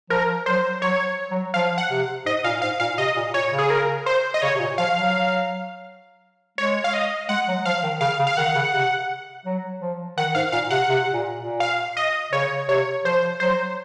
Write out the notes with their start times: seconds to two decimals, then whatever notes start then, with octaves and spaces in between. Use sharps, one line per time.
0.10 F3 A#4
0.46 F#3 C5
0.82 F#3 C#5
1.31 F#3
1.54 F3 F5
1.78 F#5
1.90 C3
2.26 G#2 D#5
2.44 A#2 F5
2.62 G#2 F5
2.80 A#2 F5
2.98 C3 D#5
3.16 A#2
3.34 A#2 C#5
3.51 C#3
3.59 G#4
3.70 A#4
4.06 C5
4.34 D#5
4.42 C#3 C#5
4.55 C3
4.60 A#2
4.78 F3 F5
4.95 F#3
6.58 G#3 C#5
6.84 F5
6.93 D#5
7.29 G#3 F#5
7.48 F#3
7.65 F3 F5
7.83 D#3
8.01 C#3 F5
8.19 C#3
8.27 F5
8.37 D#3 F#5
8.55 C#3
8.73 C3
9.45 F#3
9.81 F3
10.17 D#3 F#5
10.35 G#2 F5
10.52 A#2 F5
10.70 C3 F#5
10.89 C3
11.13 A#2
11.37 A#2
11.60 F5
11.97 D#5
12.32 C#3 C#5
12.68 C3 C#5
13.05 F3 C5
13.40 F#3 C5